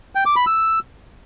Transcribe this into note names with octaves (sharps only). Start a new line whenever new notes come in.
G5
D6
B5
E6